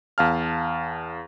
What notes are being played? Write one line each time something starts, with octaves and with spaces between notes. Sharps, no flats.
E2 F5 A5 F6